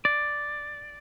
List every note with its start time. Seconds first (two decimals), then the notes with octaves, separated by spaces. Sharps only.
0.05 D5